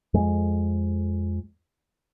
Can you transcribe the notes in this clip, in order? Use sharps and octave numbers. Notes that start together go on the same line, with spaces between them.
F2 G#3